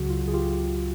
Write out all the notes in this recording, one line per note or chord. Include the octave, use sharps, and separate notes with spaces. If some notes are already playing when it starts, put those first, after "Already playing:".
Already playing: C#2 C#3 F#3 F#4
F4
G#4
F4 G4